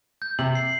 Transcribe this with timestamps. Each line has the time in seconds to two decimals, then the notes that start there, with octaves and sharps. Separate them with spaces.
0.22 G6
0.39 C3 F#7
0.55 C7